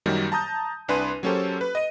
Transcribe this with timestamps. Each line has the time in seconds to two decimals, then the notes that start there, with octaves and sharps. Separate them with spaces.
0.06 F#2 D#3 F#3 G3 A#3
0.32 A5 A#5 D#6 G6
0.88 C2 D4 B4 G#5 C6 D#7
1.23 F#3 A#3 C#4 G4 A4 C5
1.61 B4
1.75 D#5 D#7